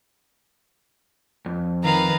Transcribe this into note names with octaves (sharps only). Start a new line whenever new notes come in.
F2
D#3 B4 F5 A#5